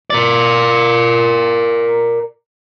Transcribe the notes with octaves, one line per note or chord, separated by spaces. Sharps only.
A#4 D5